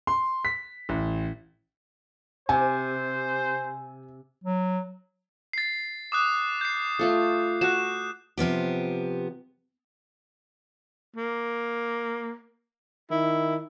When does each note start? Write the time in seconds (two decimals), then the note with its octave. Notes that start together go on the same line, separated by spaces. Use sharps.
0.07 C6
0.45 B6
0.89 A1
2.49 C3 C5 G#5
4.44 F#3
5.53 A6 C7
6.12 D6 D#6 F#6
6.61 G6 C7
6.99 A3 F4 A4
7.61 F#4 A5 F#6 E7
8.37 C3 F3 B3 G4
11.16 A#3
13.11 D#3 E4